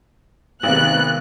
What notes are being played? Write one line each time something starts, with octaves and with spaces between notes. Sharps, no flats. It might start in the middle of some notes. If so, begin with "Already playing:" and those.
G#1 C3 D#3 B3 F#6